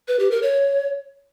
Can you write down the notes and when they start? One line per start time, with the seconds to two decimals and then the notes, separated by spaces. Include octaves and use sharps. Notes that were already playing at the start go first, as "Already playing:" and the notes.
0.08 B4
0.19 G4
0.31 A#4
0.43 C#5